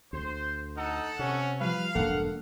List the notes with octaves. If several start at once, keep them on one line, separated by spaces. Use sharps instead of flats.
D2 C5
D#4 A4 F#5
C3 C#4
F3 G3 B4 F5
E1 G2 A#3 D4 A4 F#5